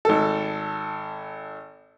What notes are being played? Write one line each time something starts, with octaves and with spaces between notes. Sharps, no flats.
G#1 A4